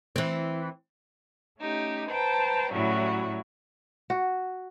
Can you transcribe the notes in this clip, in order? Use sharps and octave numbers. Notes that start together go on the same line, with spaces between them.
E3 C4
A3 C#4 D#4 G4
B4 C5 G5 A5 A#5
A2 F#3 G3 C#4 E4 F#4
F#4